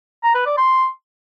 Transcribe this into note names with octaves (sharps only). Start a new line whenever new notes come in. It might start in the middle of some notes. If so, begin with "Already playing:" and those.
A#5
B4
D5
C6